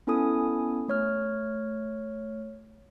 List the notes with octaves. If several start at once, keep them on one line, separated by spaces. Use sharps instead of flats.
B3 C#4 E4 A4 G#5 D#6
A3 C#5 F6